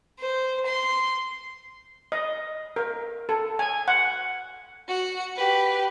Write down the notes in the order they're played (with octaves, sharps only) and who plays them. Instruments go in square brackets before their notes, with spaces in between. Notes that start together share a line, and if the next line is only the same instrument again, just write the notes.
[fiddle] C5
C6
[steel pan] D#5
A#4
A4
G#5
F#5
[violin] F#4 C#7
G4 B4